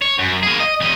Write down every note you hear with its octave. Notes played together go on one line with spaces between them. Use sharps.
C#5
F#2
A#3 G#4
D#5
E2 D#5